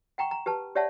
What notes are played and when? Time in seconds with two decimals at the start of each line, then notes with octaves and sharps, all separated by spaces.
0.18 F#5 G5 A#5 C#6
0.31 A#5
0.46 G4 B4 A5
0.75 G4 C#5 D5 E5 F#5 A5